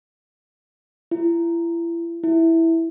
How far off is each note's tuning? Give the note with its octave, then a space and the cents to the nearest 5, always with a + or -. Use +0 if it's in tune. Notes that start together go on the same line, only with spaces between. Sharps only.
E4 +35
E4 -5